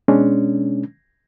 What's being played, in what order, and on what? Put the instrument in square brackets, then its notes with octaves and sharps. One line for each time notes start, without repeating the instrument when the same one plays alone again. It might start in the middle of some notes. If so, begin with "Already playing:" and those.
[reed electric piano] B2 G#3 C#4 D4